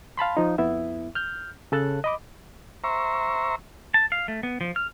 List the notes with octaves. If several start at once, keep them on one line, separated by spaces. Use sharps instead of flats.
F5 A5 B5 C6
F3 D#4
F2 B3 E4 E5
F6 G6
C#3 A4 A5 F#6
D#5 B5 D6
C5 E5 A#5 C#6
A5
F5
A3
B3
F3
F6